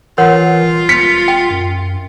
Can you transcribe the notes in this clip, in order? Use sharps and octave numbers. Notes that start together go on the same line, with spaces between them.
E3 F4 A#4 C#5 F#5
D#1
B6 C#7
G5
F#2